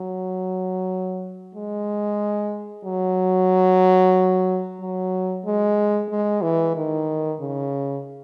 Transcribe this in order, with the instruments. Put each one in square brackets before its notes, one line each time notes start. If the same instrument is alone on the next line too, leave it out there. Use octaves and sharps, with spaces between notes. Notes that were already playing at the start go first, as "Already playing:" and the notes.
Already playing: [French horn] F#3
G#3
F#3
F#3
G#3
G#3
E3
D#3
C#3